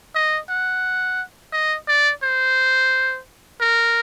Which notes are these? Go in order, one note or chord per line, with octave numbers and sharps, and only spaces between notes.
D#5
F#5
D#5
D5
C5
A#4